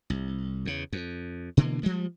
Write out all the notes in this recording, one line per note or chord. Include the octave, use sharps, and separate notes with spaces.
C2
E2 C#3
F2
B2 D3 E3 A#3
F3 G3 G#3